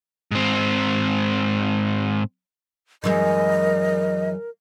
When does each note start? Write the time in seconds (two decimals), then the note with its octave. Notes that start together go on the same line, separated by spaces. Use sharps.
0.31 G#2 C4
3.04 F#2 E3 G#3 A#4 D#5